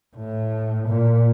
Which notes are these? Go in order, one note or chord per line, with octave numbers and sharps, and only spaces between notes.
A2
A#2